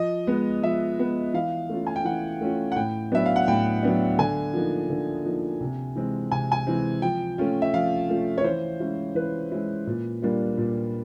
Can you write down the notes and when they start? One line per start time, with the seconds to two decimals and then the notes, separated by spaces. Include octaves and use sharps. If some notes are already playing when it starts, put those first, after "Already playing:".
Already playing: F3 D#5
0.27 G#3 B3
0.62 F3 E5
0.99 G#3 B3
1.34 E3 F5
1.69 A3 C#4 F4
1.87 G#5
1.96 G5
2.05 E3 F#5
2.41 A3 C#4 F4
2.72 F#5
2.76 A2 G5
3.12 F#3 B3 D4 E5
3.26 F5
3.36 F#5
3.47 A2 G5
3.83 F#3 B3 D4
4.19 D3 G#5
4.53 F3 A#3 D#4
4.90 D3
5.25 F3 A#3 D#4
5.61 C3
5.96 E3 G#3 C4
6.32 C3 G#5
6.52 G#5
6.67 E3 G#3 C4
7.02 F3 G5
7.38 A3 C#4 F4
7.62 E5
7.74 F3 F5
8.09 A3 C#4 F4
8.38 C#5
8.44 E3 C5
8.80 G#3 C#4 E4
9.15 E3 B4
9.52 G#3 C#4 E4
9.87 A#2
10.22 G3 A#3 D4 F4
10.58 A#2